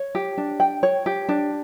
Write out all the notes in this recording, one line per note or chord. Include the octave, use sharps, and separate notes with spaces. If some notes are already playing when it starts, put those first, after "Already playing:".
Already playing: C#5
G4
D4
G5
C#5
G4
D4